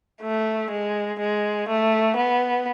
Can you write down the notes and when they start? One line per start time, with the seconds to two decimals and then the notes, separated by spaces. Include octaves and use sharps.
0.22 A3
0.71 G#3
1.20 G#3
1.69 A3
2.17 B3